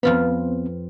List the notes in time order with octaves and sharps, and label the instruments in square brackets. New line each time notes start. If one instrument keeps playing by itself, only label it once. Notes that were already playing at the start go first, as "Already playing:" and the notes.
[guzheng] F2 F4 B5 [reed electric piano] B3 C4 [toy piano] B4